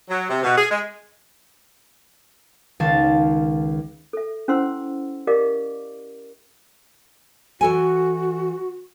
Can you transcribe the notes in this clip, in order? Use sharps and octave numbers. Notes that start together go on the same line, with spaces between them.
F#3
C3
B2
G#4
G#3
C#2 D#3 F5 A5 G#6 A6
A4 E5
C#4 E4 C5 F#5 C6 E6
G4 A#4 D5 D#5 F5 D6
E3 F#4 A4 G#5